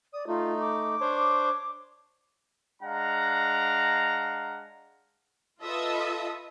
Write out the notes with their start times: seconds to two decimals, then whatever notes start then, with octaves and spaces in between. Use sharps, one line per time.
0.13 D5 D#6
0.27 A3 D#4 F4
0.60 D6
1.01 D4 C5 C#5
2.82 G#3 D4 F5 F#5 A#5
5.63 F4 A4 B4 D#5 E5 D#6